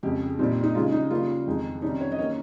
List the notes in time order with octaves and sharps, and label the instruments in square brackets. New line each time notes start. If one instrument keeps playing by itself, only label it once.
[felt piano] F2 C#3 G#3 G4
A#2 G3 C4 D#4
D#4
C#3 G#3 D#4 F4
D#4
C#3 G3 A#3 F4
F2 D#3 G#3 D#4
C3 D#3 G3 C#4 D#4
C#5
D#5
D#3 A#3 C#4 C#5